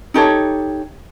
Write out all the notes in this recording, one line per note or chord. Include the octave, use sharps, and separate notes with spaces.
D#4 G4 A4 C#5